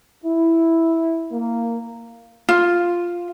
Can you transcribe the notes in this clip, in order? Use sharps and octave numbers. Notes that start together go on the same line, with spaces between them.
E4
A#3
F4